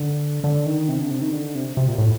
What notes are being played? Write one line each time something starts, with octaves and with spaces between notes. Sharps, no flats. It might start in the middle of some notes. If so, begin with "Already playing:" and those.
Already playing: D3
D3
D#3
C3
D3
C3
D#3
D3
C3
C3
A#2
A2